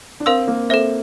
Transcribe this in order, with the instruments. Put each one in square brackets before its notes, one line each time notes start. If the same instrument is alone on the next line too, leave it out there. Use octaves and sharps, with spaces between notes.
[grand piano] D4
[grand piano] C4 [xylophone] A#4 F5 C6 E6
[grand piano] A#3
[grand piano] C4 [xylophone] A4 C5 E5